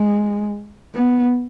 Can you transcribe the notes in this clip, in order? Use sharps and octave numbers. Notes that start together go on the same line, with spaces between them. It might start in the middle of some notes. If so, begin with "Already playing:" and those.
Already playing: G#3
B3